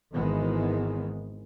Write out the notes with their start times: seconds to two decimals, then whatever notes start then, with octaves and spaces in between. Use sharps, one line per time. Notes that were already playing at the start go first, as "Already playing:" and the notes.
0.13 G#1 D#3 E3 G#3 B3